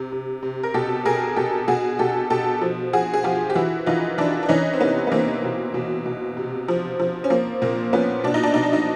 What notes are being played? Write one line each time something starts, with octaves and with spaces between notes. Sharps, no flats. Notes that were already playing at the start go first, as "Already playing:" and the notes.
Already playing: C3
C3
C3
A#4
B2 G4 A4
B2 G#4 A#4
B2 G4 A4
B2 F#4 G#4
B2 G4 A4
B2 G4 A4
F3
F3 F#4 G#4
G#4
F3 F4 G4
G4
E3 E4 F#4
E3 D#4 F4
E3 D4 E4
D4
E3 C#4 D#4
C4
C3 B3 C#4
B3
E3 A#3 C4
B2
B2
B2
C3
F3
F3
C#4
F3 A#3 C4
A#2 A#3 C4
F3 B3 C#4
B2 D4
D#4
D4
B2 D#4
D4
D#4